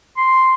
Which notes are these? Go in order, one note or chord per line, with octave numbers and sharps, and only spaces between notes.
C6